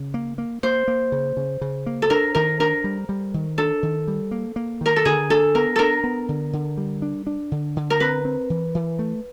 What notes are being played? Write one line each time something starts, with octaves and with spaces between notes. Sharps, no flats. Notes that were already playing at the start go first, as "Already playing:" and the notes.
Already playing: C#3
A#3
A#3
A#3 C5
A#3
C#3
C#3
C#3
A#3
A4
D4 A#4
D#3 A#4
D4 A#4
G3
G3
D#3
D4 A4
D#3
G3
A#3
A#3
D#3 A#4
A4
D3 G#4
D4 A4
B3 A#4
D4 A4 A#4
B3
D3
D3
G3
D4
D4
D3
D3
A#4
C4 B4
C4
E3
E3
A3